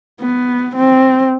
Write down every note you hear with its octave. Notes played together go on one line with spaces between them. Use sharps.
B3
C4